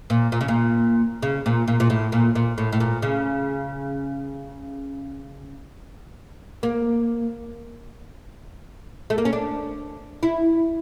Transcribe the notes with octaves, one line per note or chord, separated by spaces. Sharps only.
A#2
A#2
C#3
A#2
C#3
A#2
A#2
A#2
A2
A#2
A#2
A2
A2
A#2
C#3
A#3
A3
A#3
C#4
D4
E4